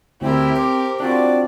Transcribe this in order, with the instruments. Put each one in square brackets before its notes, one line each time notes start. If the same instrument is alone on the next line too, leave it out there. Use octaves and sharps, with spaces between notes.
[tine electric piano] D2 [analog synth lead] C4 [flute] E4 [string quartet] G4 A#4
[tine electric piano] C5 [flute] D6
[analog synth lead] C4 [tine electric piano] D4 F4 F#4 [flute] D5